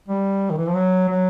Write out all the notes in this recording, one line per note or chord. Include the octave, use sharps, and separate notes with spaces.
G3
D#3
E3
F3
F#3
F#3